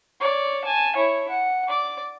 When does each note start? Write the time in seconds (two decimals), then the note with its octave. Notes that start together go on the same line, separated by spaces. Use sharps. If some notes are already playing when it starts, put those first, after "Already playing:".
0.20 C#5 D5
0.65 G#5 A5
0.96 E4 C#5
1.29 F#5
1.68 D5 D6